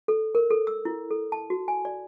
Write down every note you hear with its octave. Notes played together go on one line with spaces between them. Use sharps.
A4
A#4
A4
E6
E4
A4
A5
F#4
G#5
D5